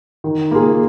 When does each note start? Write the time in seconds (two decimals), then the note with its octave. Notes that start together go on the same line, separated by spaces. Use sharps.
0.24 D#3
0.51 A#3 F4 G#4